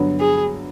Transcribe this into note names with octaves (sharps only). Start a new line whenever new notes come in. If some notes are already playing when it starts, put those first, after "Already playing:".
Already playing: G2 D3 F#3 B3
G#4